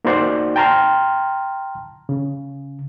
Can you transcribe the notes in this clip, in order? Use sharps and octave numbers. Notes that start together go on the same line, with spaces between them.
A#3 D#4 F#4 C5 D5 F#5
G5 A5 A#5 C6 F6
C#3